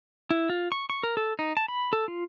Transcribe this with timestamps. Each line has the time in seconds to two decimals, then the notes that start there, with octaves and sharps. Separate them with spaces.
0.31 E4
0.50 F4
0.72 C#6
0.90 C#6
1.03 A#4
1.17 A4
1.39 D#4
1.57 A5
1.68 B5
1.93 A4
2.08 F4